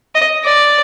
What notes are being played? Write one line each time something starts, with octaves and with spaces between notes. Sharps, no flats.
D#5
D5